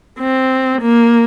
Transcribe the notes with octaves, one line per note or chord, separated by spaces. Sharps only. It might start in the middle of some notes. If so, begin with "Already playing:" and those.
C4
A#3